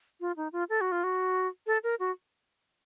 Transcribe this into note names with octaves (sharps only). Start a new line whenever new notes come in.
F4
D#4
F4
A4
F#4
F4
F#4
A4
A#4
F#4